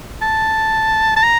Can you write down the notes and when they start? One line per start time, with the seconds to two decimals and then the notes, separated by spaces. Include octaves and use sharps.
0.22 A5
1.16 A5
1.23 A#5